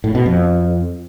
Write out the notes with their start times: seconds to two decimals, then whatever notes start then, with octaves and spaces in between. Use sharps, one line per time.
0.04 A2
0.15 B2
0.26 F2